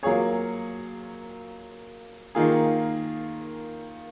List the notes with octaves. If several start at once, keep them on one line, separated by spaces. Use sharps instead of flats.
F#3 A#3 F4 G#4 C#5
D#3 A#3 F4 G#4